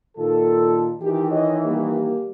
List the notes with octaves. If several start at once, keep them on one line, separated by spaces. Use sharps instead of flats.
A#2 D#3 F4 A4
D#3 E3 G4
C#5 D#5
G3 A#3 G4